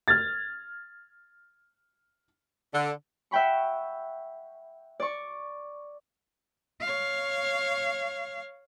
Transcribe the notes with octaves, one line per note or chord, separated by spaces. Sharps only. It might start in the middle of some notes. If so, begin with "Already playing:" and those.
F6 G#6 A6
D3
E5 F#5 G5 B5 C#6
D5 C#6
C#5 F5